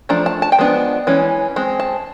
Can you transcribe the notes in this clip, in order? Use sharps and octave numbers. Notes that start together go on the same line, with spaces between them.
F3 A3 D4 A#5
A5
A5
G5
F3 G#3 B3 D4
E3 G#3 C#4
G#3 C4
A5